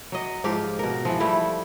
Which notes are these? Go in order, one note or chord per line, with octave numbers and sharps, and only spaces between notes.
F#3 D#5
G#2 F3 G4 F5
B2 A#4
E3 F3
F3 G3 A3 E4